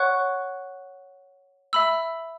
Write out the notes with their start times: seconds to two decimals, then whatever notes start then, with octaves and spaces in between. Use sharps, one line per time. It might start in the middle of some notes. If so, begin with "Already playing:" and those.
Already playing: C#5 F#5 C#6 F#6
1.73 E5 B5 E6